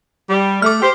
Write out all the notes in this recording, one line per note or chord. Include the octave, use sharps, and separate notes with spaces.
G3
A3 D6 F6
G4 C5